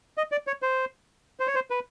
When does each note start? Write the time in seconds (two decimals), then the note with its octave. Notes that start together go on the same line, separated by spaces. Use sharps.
0.18 D#5
0.32 D5
0.47 C#5
0.62 C5
1.40 C5
1.47 C#5
1.55 C5
1.70 B4